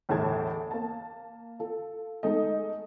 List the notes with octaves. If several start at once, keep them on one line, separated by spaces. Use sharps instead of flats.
G1 E2 A2 G#4 A5 G#6
A#3 A5
F4 A4
G#3 A3 D#4 A4 D#5